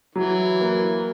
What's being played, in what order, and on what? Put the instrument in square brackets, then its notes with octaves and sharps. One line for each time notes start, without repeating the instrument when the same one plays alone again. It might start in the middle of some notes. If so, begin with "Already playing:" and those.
[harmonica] E3 [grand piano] F#3
[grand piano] A#3